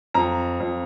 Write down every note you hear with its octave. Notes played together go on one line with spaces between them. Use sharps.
F2 A#5
F2